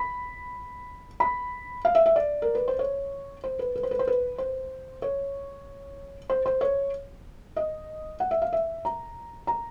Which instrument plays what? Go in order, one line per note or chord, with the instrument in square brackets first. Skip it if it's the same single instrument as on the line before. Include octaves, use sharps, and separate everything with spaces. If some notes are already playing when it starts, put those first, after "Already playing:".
Already playing: [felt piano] B5
B5
F5
E5
E5
D5
A#4
B4
C5
C#5
C5
B4
B4
C5
B4
C5
B4
C5
C#5
C5
C5
C#5
D#5
F#5
E5
F5
E5
A#5
A#5